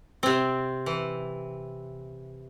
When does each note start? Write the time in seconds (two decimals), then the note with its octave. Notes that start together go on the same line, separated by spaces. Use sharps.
0.23 C3 C4
0.86 E3